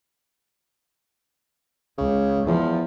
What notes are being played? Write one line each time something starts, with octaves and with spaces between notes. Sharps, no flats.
C#2 C#3
E2 F3